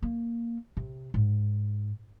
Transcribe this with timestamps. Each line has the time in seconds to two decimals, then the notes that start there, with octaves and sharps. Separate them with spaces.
0.02 A#3
0.77 C3
1.14 G#2